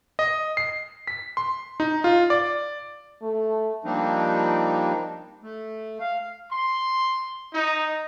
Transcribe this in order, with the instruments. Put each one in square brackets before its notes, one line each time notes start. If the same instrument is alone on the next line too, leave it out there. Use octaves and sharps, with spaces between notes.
[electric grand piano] D#5
C7
B6
C6
D#4
F4
D5
[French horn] A3
[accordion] F3 G3 A#3 C4 D4 D#4
A3
F5
[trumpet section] C6
D#4